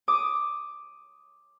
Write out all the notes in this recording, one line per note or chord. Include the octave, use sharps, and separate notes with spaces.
D6 D#6